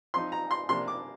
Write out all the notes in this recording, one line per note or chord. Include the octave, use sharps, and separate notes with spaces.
F3 C4 D#4 C6
A#5
C6
C3 F3 A#3 D4 C6
D6